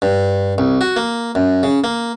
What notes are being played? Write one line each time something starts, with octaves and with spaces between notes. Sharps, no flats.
G2
C2
F#4
A#3
F#2
C#3
A#3